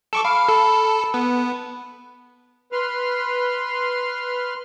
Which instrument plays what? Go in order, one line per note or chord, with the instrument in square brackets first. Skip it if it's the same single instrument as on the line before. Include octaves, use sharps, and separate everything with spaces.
[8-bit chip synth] A4 C#6 D6 [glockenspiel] A5 D7 E7
[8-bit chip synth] F5 [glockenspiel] B5
[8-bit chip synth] A4 [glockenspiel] A5 B5
[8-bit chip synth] B3
[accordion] B4 C6 F6